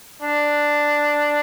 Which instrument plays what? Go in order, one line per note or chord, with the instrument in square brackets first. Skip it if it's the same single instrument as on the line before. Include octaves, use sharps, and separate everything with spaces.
[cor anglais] D4